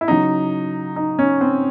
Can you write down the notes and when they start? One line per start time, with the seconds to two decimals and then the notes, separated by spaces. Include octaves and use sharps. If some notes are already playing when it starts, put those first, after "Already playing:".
0.01 E4
0.08 C#3 F#3 D#4
0.96 D#4
1.19 C#4
1.41 C4